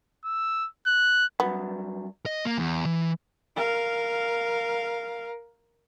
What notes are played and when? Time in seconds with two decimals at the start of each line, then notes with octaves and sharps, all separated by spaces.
0.25 E6
0.86 F#6
1.40 G2 F#3 B3
2.26 D#5
2.45 A#3
2.58 E2
2.86 E3
3.56 A#4 F5